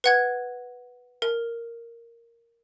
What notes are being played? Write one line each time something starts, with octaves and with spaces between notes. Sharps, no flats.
B4 F#5 G#6
A#4